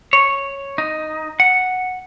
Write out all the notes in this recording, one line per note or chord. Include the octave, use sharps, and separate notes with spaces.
C#5
D#4
F#5